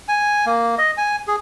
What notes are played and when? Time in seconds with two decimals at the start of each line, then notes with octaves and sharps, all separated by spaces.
0.08 G#5
0.46 A#3
0.78 D#5
0.97 G#5
1.28 G#4